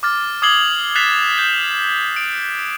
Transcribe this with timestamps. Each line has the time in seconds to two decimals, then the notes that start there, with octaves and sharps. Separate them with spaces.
0.03 D6 F6 A6
0.42 D6 D#6 G#6 C7 F#7 G7
0.95 F#6 A6 B6 C7 E7 F7
1.38 G6 E7
2.16 D7